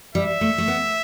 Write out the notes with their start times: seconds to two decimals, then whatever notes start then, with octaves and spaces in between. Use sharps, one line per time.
0.14 G3 E5
0.41 A3
0.58 A3
0.68 B3